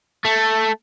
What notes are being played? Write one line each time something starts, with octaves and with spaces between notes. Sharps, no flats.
A3